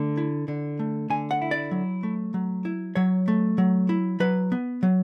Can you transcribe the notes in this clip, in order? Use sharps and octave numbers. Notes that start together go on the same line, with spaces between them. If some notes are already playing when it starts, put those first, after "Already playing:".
Already playing: D3 A3
E4
D3
A3
D3 G#5
F#5
E4
D5
F#3
A3
F#3
E4
F#3 C#5
A3
F#3
E4
F#3 B4
B3
F#3